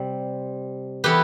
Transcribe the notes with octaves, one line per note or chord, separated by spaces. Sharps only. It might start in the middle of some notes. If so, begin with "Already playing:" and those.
Already playing: C3 G3 C4
E3 B3 G4 B4